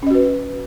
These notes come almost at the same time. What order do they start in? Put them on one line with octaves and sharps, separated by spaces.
C#4 D#5 F#4 B4